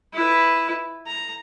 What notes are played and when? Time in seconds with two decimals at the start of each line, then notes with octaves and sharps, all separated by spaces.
0.14 E4 B4
1.06 A#5